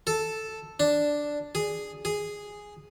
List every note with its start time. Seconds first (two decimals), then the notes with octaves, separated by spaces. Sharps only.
0.07 A4
0.80 D4
1.55 G#4
2.05 G#4